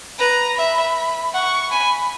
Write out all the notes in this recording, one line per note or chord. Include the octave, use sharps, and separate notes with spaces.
B4 A#5
E5 B5
F#5 C#6
G#5 B5